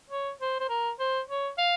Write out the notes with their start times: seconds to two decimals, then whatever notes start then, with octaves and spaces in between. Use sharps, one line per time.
0.10 C#5
0.40 C5
0.60 C5
0.69 A#4
0.99 C5
1.29 C#5
1.58 F5